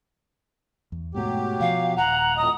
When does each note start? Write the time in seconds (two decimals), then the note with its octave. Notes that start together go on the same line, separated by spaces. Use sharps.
0.92 E2
1.14 G#2 B2 F#3 A3 G4
1.60 B2 F3 F5
1.96 D#1 F#5 A#5
2.37 F2 A2 D#5 D#6